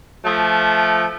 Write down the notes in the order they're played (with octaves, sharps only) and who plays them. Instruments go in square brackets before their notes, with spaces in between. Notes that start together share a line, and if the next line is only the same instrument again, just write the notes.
[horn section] F3 A3